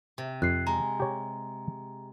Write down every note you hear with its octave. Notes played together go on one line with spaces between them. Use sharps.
C3
F2 F#6 C7
G#3 A#5
G4 C#5